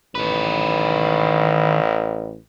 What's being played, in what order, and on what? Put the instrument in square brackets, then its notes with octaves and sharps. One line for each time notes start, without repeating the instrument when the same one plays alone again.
[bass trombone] A1 [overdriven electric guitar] D#3 B4